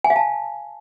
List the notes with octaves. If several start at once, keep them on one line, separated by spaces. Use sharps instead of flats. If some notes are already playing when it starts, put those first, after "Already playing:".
G#5
F5
A5